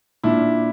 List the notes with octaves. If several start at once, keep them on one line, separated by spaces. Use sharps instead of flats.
A#2 D4 E4